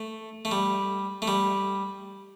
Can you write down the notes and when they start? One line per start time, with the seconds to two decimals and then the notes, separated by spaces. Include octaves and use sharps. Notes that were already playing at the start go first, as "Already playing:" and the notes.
Already playing: A3
0.45 A3
0.51 G3
1.22 A3
1.28 G3